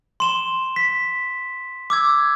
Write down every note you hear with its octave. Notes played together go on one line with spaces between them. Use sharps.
C6 E7 G7
B6
D6 E6 G#6